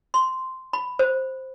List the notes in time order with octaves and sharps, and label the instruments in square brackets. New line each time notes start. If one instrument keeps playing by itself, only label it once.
[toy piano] C6
B5
C5